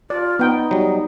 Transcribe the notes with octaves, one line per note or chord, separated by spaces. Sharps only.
F4 D5
B3 D#4 G5
F#3 G3